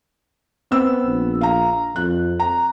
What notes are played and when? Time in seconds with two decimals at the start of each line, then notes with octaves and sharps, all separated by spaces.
0.71 B3 C4 E6
1.07 A#1
1.41 F5 A#5
1.96 F2 F#6
2.40 A#5